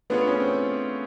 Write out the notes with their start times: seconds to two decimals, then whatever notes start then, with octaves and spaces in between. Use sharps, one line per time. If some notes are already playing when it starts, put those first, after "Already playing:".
0.10 A3 B3 D4 F4 G#4 C#5
0.27 C#4
0.40 C4